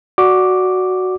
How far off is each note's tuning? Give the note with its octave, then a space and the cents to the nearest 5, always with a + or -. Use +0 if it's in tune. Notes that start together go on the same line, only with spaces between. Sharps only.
F#4 +0 D5 +0 D6 +0